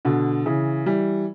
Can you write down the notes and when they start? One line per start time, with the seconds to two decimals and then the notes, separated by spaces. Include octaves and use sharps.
0.05 B2 D3
0.46 C#3 E3
0.86 E3 G3